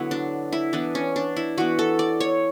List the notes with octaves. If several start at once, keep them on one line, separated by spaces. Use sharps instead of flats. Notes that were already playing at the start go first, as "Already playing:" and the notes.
Already playing: D3 F#3 B3 E4
D4
E4
E3 B3 D4
C#4
D4
E4
E3 B3 F#4
A4
D5
C#5